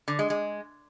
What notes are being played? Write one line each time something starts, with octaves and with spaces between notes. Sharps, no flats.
D3
G#3
G#3